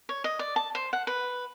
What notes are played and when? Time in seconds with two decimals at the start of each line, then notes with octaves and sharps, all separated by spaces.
0.09 C#5
0.24 D#5
0.39 D5
0.56 A5
0.75 C5
0.93 F#5
1.07 B4